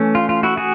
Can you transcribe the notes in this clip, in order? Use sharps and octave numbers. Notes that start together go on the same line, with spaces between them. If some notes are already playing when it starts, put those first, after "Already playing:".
Already playing: E3 A3 C#4
F4
F4
E4 F#4
F#4 G#4